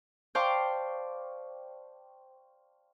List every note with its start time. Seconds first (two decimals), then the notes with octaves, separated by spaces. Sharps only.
0.35 C5 D5 F5 G5 A5 C#6